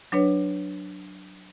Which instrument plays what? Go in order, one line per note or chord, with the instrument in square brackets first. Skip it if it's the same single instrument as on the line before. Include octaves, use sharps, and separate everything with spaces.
[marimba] F#3 D4 B4 C#5